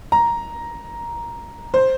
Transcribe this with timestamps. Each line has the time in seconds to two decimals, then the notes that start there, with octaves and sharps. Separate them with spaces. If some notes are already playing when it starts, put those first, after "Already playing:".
0.12 A#5
1.74 C5